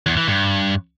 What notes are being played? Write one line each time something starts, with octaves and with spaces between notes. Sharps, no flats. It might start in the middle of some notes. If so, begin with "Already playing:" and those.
E2
E3
G2